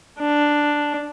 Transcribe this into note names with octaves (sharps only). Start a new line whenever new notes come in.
D4